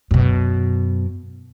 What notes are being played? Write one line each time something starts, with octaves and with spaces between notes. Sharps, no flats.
F#2 B2